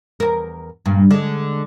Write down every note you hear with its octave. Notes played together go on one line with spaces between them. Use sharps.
E2 G2 A#4
G2 A#2
D3 G#3